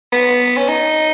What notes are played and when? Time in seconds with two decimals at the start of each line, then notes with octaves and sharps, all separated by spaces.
0.12 B3
0.57 C#4
0.68 D#4